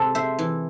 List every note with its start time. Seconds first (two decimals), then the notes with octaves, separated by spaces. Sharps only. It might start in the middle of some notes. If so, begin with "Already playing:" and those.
Already playing: C3 G#3 A4
0.15 C5 E5
0.39 E3